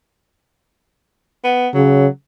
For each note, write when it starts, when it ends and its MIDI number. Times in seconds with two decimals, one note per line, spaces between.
1.44 1.68 59
1.74 2.08 49
1.74 2.06 54